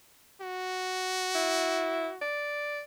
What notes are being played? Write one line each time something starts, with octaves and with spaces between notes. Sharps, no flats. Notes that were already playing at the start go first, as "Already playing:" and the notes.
F#4
E4
D5